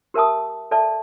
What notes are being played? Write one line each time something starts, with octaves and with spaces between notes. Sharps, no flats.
G4 A#4 E5 A5 D#6
A4 D5 E5 A5